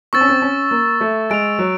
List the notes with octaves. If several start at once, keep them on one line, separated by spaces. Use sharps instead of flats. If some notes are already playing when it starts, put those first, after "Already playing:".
C4 C#6 E6 A6
C#4
C4
C#4
A#3
A3
G#3 A6 D7 F7
F#3